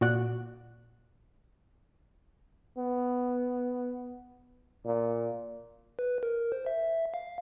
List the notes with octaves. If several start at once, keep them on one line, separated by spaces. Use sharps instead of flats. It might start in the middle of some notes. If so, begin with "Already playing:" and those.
A#2 F#4 D5 F#6
B3
A#2
B4
A#4
C5
E5
F5